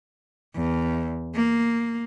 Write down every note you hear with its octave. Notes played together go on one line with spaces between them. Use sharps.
E2
A#3